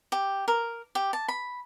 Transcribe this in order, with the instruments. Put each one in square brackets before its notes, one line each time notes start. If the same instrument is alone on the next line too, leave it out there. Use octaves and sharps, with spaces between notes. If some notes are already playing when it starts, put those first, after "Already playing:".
[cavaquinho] G4
A#4
G4
A5
B5